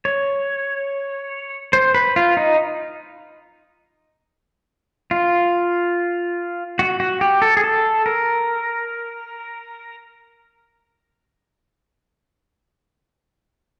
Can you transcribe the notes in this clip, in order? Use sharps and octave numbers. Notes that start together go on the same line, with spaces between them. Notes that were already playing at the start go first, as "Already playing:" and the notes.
C#5
C5
B4
F4
D#4
F4
F#4
F#4
G4
A4
G#4
A4
A#4